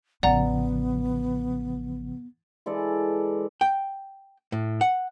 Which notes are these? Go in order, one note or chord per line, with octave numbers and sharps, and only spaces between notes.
A1 C#3 F3 B3 D5 F#5 A#5
E3 G#3 A4 D5
G5
A2
F#5